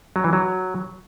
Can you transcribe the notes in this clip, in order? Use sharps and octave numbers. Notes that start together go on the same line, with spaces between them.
F#3
E3
F#3